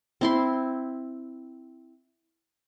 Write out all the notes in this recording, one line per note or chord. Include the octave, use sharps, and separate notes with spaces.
C4 E4 C6